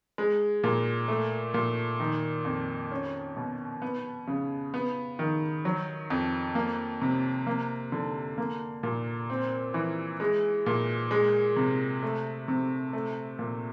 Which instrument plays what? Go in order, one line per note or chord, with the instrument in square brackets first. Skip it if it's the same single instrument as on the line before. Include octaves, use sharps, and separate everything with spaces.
[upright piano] G#3
A#2
A3
A#2
D#3
F2
C#4
B2
B3
C#3
B3
D#3
F#3
F2
A#3
C3
A#3
D3
A#3
A#2
C4
E3
G#3
A#2
G#3
C3
A3
C3
A3
A#2